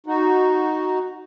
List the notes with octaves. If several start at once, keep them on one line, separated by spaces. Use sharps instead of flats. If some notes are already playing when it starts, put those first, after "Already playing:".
D#4 F#4